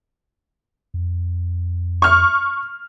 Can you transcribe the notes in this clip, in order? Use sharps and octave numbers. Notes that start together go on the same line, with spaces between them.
F2
C#6 F6